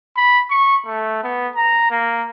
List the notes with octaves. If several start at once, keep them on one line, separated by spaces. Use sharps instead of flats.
B5
C#6
A3
B3
A#5
A#3